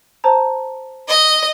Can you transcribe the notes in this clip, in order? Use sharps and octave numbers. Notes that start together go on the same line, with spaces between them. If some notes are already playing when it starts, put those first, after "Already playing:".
C5 A5 A#5
D#5